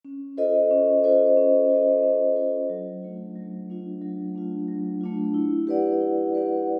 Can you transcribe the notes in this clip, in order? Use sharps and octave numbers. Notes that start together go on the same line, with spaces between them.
C#4
F4 A4 C5 D#5
C#4
F4 A4 C5 D#5
C#4
F4 A4 C5 D#5
C#4
F4 A4 C5 D#5
F#3
A3 D4 F4
F#3
A3 D4 F4
F#3
A3 D4 F4
F#3
A3 D4 F4
E4
G4 B4 D5 F#5
E4
G4 B4 D5 F#5